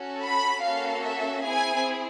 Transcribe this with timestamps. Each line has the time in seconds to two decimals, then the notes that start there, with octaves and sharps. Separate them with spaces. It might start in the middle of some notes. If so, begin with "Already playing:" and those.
Already playing: C#4 F#4 A4
0.25 B5
0.65 A#3 C#4 F#4 A4 F5
1.05 E5
1.45 C4 E4 G#4 G#5